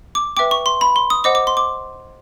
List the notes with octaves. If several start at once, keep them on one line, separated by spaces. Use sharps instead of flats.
D6
B4 E5 G5 D6
C#6
C6
B5
C6
D#6
C5 D#5 F#5 D6
D6
C6
D6